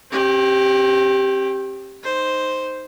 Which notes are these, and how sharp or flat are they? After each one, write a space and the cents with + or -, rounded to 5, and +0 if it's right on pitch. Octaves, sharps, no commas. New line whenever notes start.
C4 +45 G4 +0
D#4 +0 C5 +0